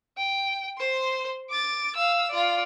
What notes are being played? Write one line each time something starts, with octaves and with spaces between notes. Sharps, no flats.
G5
C5 C6
D6 A6
F5 E6
F4 D5